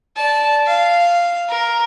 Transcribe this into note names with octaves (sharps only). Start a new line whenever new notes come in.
D5 A5
F5
A#4